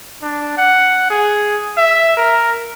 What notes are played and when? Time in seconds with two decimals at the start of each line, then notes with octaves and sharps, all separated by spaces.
0.22 D4
0.57 F#5
1.10 G#4
1.77 E5
2.17 A#4